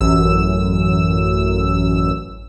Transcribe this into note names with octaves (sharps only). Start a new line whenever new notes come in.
A1 F#2 E6